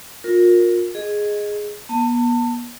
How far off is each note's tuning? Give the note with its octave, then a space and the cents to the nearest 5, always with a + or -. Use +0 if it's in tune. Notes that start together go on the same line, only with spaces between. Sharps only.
F4 +35 A#4 +0
G#4 +0 D#5 -5
B3 -40 A5 +30